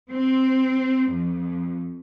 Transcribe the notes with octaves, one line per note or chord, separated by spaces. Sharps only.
C4
F2